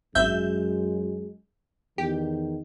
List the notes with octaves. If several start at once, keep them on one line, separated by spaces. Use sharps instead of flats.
G#1 F#2 G#3 E5 G6
E2 D#3 G4